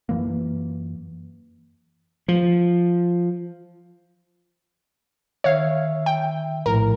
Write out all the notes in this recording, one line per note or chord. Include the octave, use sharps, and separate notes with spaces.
F#2 E3 A#3
F3
D#3 C#5 E5 F5
G5
A#1 A2 A#4